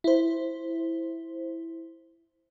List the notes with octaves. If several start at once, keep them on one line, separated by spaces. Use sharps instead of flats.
E4 C5